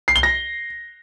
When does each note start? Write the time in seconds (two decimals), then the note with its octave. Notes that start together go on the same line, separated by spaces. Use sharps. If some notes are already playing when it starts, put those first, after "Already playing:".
0.08 C7
0.16 G7
0.23 A#6